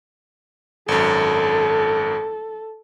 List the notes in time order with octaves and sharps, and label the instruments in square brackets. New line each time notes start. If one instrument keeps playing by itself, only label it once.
[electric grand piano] G#1 F#2 [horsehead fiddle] A4